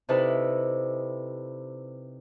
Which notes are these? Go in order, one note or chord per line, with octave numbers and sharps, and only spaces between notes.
C3 D#4 E4 A4 B4 D5